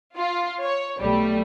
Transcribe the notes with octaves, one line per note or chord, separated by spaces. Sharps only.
F4
C#5
B1 G3 A3